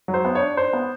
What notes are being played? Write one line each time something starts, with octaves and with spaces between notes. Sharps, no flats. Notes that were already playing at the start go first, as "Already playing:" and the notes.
F#3
C5
B3
C#5
D4
D4 C5
B3